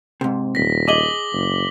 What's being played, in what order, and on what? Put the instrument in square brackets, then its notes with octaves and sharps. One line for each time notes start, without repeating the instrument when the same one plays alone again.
[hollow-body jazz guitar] G#2 C3
[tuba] D#1 [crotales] A#6 B6
[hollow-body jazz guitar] G#4 D#5 [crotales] D6 F#7 G7
[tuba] F#1